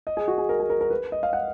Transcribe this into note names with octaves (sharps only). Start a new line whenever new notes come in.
D#5
G#4
F#4
G#4
A#4
G#4
A#4
A#4
B4
D#5
F5
F#5